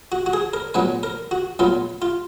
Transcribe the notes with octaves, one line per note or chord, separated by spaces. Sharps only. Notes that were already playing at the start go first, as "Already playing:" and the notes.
F#4
F#4
G#4
A#4
A#2 F#3 B3 B4
A#4
F#4
A#2 F#3 B3 F4
F4